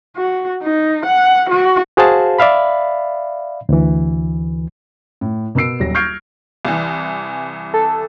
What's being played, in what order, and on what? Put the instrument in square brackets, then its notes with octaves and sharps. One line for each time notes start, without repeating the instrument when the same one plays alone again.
[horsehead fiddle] F#4
D#4
F#5
F#4
[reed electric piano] F#4 G#4 C5 F5 A5
D5 E5 F5 B5
D2 E3
[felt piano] A2
B2 B3 A#4 E6 C7 D7
D#1 F#3 A#6
C#6 F6 G6 G#6 C7 D7
[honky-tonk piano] C2 E3
[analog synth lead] A4